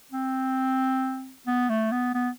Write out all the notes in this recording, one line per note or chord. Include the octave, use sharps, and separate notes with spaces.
C4
B3
A3
B3
B3